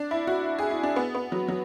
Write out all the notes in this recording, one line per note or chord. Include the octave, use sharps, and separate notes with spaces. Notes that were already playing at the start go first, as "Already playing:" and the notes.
Already playing: D4
E4
F#4
G#4
E4
D4
B3
B3
F#3
F#3